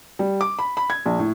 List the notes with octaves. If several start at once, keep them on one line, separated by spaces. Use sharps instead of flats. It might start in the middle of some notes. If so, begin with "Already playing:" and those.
G3
D6
B5
B5
G#6
A#1
A2